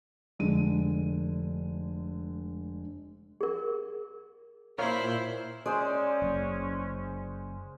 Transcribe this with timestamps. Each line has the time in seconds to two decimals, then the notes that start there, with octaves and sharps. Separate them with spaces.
0.39 F1 D3 G#3 D#7
3.41 G#4 A#4
4.78 A#2 E4 A#4 C5 C#5 F5
5.66 G#3 C#4 C5 D5
6.22 F#1